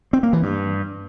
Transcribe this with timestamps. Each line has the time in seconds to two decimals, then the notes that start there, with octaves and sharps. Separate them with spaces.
0.13 C4
0.23 A#3
0.33 E3
0.43 G2